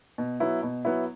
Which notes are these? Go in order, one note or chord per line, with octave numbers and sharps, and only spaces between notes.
B2
F#3 B3 E4
B2
F#3 B3 E4